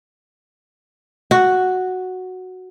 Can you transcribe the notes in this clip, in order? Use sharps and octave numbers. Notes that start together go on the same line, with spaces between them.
F#4